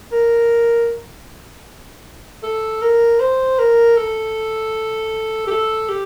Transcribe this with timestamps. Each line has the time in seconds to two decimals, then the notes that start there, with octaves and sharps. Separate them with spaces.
0.12 A#4
2.43 A4
2.81 A#4
3.19 C5
3.59 A#4
3.97 A4
5.47 G4
5.50 A4
5.89 G4